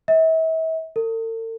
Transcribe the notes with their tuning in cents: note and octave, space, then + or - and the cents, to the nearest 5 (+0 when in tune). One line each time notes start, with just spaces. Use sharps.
E5 -40
A4 +45